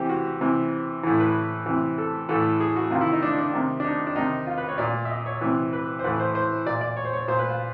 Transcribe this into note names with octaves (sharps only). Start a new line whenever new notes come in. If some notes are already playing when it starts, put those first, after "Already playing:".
Already playing: C3 E3 G4 C5
F#4
C3 E3
A2 E3
B4
C3 E3
A4
A2 E3 A4
G#4
F#4
C3 D#3 F4
E4
D#4
D4
D4
C3 D#3
D4
D#4
D4
C3 D#3 D#4
F4
B4
C#5
A#2 D5
E5
D#5
C#5
C3 E3 B4
B4
C5
A2 E3 B4
C5
C5
A#2 D5
D5
C#5
C5
C#5
A#2 C5
B4
F4